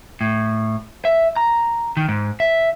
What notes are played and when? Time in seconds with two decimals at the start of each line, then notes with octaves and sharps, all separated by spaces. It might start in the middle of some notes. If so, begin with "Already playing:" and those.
0.21 A2
1.05 E5
1.36 A#5
1.97 D#3
2.08 G#2
2.40 E5